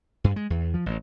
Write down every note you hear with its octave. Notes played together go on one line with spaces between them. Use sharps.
G2
G#3
E2
F3
A1